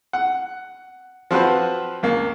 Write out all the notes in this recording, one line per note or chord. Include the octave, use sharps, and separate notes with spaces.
F#5
F3 C4 F#4 B4
C#2 A#3